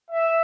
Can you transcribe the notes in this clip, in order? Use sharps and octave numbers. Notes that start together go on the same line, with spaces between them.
E5